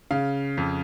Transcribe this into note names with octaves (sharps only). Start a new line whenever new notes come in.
C#3 F5
F2